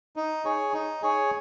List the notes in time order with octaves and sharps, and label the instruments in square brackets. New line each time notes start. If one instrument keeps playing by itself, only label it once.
[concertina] D#4
G#4 C#5
D#4
G#4 C#5